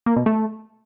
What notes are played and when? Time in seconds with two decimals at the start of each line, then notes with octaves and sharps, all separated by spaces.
0.06 A#3
0.16 B2
0.26 A3